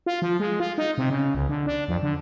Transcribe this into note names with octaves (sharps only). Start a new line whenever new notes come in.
F4
F3
G#3
F4
D#4
C3
C#3
C#2
D3
D4
F2
D3